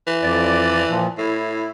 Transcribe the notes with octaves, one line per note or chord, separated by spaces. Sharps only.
E3
F2 D5
A#2 F3
A2 E4